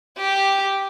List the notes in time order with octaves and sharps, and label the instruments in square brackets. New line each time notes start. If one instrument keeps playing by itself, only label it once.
[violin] G4